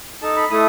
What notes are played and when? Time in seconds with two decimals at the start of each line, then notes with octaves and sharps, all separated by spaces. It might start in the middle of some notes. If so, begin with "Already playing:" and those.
0.22 D#4 A4 A5
0.36 B5
0.50 A3 E4 A4 D#6